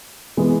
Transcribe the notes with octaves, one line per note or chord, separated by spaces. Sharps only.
E3 G#3 B3